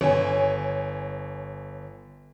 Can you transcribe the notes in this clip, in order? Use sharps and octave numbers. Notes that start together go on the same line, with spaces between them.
G1 C#5 G#5